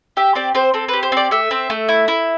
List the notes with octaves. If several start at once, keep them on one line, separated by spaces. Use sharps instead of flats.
G4 E5
C4 D5
C4 C5
C4 A4
G4 B4
C5
C4 D5
A3 E5
C4
A3
E4
E4